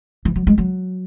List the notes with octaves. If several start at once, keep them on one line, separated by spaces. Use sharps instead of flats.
E3
F#3
G#3
F#3